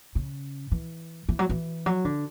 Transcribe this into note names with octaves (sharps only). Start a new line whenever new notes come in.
C#3
E3
E3
F#3
E3
F#3
D3